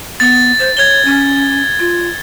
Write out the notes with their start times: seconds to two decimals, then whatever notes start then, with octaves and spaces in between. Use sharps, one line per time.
0.20 B3 A6
0.59 C5
0.77 C#5 G#6 G7
1.05 C#4
1.79 F4